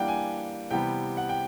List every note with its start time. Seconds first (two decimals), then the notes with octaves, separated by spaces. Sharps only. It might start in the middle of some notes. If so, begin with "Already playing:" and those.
Already playing: E3 G3 A#3 D4 F#5 G5
0.08 G#5
0.71 C3 E3 G3 B3 G5
1.17 F#5
1.29 G5